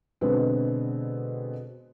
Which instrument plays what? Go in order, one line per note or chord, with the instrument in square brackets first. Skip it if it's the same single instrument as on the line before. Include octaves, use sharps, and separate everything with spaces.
[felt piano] B2 D3 G#3 B3 C4